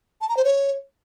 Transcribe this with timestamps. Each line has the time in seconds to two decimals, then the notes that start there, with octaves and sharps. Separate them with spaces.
0.21 A5
0.29 A#5
0.37 C5
0.45 C#5